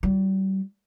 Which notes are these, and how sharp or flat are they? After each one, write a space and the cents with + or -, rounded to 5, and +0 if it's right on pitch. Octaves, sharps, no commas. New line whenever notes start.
G3 -35 F4 +0